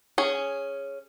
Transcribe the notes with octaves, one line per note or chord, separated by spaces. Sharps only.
C#4 G#4